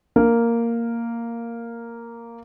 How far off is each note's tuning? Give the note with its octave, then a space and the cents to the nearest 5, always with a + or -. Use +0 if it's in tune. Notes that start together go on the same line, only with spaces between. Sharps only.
A#3 -5